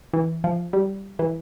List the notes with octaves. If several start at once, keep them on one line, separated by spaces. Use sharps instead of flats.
E3
F3
G3
E3